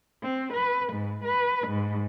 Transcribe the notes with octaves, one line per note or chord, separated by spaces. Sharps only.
C4
B4
G#2
B4
G#2